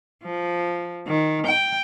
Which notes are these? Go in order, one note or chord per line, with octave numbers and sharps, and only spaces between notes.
F3
D#3
G5